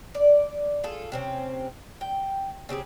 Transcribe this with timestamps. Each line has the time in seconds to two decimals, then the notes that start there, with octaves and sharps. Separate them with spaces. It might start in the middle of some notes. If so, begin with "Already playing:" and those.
0.15 D5
0.84 F4 G#4 A4
1.12 C3 C4 C#4
2.01 G5
2.69 C#3 C4 G4 G#4